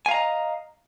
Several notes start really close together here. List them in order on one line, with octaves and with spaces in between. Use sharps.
G#5 F5 A#5 D#5